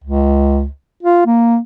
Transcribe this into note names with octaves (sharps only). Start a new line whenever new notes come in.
C#2
F4
A#3